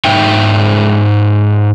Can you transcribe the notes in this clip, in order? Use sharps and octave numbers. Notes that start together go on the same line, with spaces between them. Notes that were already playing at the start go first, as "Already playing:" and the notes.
G#2 D#4 E5 G5